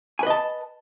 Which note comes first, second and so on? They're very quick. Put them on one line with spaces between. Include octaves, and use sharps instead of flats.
G#5 B4 D#5 A5